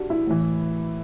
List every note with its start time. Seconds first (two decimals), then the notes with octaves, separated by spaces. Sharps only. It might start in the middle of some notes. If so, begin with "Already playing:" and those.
Already playing: D4 F#4 G4
0.10 E4
0.27 A2 E3